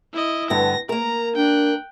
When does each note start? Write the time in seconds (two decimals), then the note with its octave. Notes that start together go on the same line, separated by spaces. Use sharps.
0.14 E4 D#5
0.50 G2 D3 B3 A#6
0.89 A#3 A#4 A#5
1.36 D4 G5 F#6